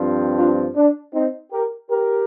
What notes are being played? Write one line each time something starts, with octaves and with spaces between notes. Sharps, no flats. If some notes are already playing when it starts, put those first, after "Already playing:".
Already playing: G2 F3 C4
D4 F4
D4
C4 D#4
G4 A#4
G4 A#4